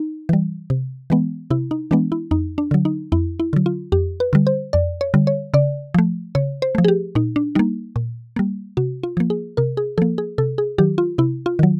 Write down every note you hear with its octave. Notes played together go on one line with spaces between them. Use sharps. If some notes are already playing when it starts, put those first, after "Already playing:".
Already playing: D#4
E3 G3
C3
E3 G#3 B3
C3 E4
D#4
E3 G#3 B3 D4
E4
F2 D#4
D4
D3 F#3
D#4
F2 E4
E4
D3 F#3
F4
F2 G4
B4
D3 G3
C5
F2 D5
C#5
D3 G3
C#5
C#3 D5
F3 A3
C#3 C#5
C5
F3 A3
G#4
G4
A#2 D#4
D4
G3 A#3 D#4
A#2
G3 A#3
C3 F#4
F4
F3 A#3
G#4
C3 A#4
G#4
F3 A#3 A4
G#4
C3 A4
G#4
D#3 F#3 G4
F4
C3 E4
F4
D#3 F#3